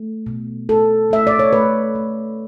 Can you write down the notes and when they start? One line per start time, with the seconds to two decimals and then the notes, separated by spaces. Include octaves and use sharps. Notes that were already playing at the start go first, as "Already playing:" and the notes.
Already playing: A3
0.26 B2
0.69 A3 A4
1.11 A3 E5
1.27 D5
1.39 C#5
1.53 A3 B4
1.95 A3